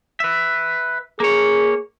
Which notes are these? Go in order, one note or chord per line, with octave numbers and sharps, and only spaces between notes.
B4 E5
A#3 G#4 C#5